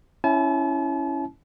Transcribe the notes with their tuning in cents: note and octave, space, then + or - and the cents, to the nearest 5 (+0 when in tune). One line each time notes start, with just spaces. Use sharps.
C#4 +0 E4 +0 A5 -40